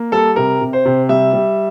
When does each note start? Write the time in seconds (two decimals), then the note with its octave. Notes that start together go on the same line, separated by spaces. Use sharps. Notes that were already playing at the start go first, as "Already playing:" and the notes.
Already playing: A#3
0.12 G3 A4
0.36 C3 A#4
0.61 C3
0.73 C5
0.86 C3
1.09 G3 E5
1.33 G3